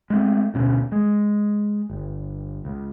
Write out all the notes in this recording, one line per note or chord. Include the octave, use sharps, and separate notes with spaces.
G#3 A3 B3 C4
D2 B2 C#4
G#3
G1
C#2